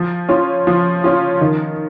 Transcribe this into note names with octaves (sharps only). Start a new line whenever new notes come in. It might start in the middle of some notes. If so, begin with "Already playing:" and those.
Already playing: F3
C#4 F4
F3
C#4 F4
D#3